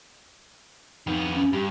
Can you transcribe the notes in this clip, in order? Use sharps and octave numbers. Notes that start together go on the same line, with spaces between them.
F2 B3 D#4
C#4
G2 G4